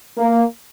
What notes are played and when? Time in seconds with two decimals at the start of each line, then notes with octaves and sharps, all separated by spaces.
0.17 A#3